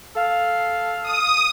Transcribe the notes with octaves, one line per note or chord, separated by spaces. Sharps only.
A4 F5
D#6